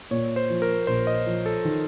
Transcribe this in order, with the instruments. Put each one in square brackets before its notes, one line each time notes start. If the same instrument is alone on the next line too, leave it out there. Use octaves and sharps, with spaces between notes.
[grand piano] A#2 [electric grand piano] C#5
[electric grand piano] C5
[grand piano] F3
[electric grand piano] A#4
[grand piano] A#1 [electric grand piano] C5
[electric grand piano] D#5
[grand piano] F3
[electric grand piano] A4
[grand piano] D#3